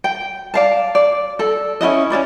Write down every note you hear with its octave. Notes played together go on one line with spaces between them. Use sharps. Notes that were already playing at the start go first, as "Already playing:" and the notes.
G5
D5 F5 A5
D5
A4 D5
C#4 E4 F#4 D#5
C#4 F#4 D5 B5